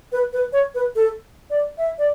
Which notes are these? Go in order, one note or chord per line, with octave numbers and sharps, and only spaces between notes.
B4
B4
C#5
B4
A4
D5
E5
D5